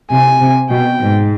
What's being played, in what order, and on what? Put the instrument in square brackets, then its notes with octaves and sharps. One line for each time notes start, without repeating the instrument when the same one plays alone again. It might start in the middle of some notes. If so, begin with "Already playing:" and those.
[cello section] C3 [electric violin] G#5
[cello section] C3
[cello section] B2 [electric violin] G5
[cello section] G#2